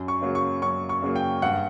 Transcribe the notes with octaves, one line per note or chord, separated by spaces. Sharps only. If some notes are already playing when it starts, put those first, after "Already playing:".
Already playing: F#2
C#6
C#3 F#3 A#3
C#6
F#2 C#6
C#6
C#3 F#3 A#3
G5
G2 F#5